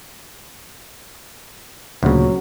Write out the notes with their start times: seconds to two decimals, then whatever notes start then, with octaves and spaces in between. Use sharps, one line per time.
2.03 D2 A#2 C#3 F#3